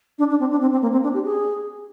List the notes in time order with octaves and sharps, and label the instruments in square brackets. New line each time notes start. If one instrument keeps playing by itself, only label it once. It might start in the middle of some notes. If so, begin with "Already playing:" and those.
[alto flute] D4
D4
C4
D4
C4
C4
A#3
C4
D4
G4
G#4